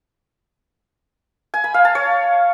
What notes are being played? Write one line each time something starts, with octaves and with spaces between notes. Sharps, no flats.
G#5
B5
F5
A5
C#5